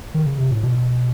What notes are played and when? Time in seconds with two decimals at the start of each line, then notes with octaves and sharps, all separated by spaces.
0.14 D#3
0.26 C#3
0.38 C3
0.51 A2
0.63 B2